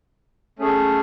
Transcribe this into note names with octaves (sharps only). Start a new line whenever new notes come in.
A3 C#4 G#4